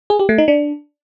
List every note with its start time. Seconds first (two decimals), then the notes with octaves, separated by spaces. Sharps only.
0.10 G#4
0.19 G4
0.29 A3
0.38 D#4
0.48 D4